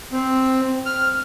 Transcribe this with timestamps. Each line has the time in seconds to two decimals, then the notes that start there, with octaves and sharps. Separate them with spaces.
0.12 C4
0.86 F6